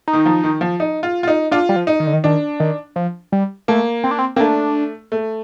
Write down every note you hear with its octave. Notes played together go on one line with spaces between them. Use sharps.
D#4
D#3
F3
D#3
F3
D#4
F4
F4
D#4
D4 F4
G3
F3
D#4
D#3
D3
D#3
D#3 D4
D#3
F3
G3
A3 A#3
C4
D4
C4
A#3 C4
A3 D4
A3